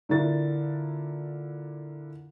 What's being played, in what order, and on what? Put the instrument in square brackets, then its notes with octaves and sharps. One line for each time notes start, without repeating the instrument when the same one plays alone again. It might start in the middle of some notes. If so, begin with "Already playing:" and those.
[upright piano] A#2 D3 D4 E4 A#4 A6